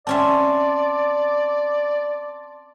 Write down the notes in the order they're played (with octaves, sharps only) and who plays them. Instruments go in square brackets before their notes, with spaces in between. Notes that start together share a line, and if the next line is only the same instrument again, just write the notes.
[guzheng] C4 C#4 E5 [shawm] D5 [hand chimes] A5 C6